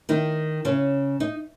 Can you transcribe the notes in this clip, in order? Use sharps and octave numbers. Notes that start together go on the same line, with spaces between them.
D#3 D#4
C#3 C#4
D#4